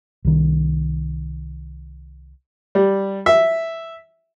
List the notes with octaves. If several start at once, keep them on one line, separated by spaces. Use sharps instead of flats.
C2 D#3
G3
E5